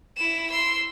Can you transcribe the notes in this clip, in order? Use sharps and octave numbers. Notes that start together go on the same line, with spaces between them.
E4 E7
C6 E6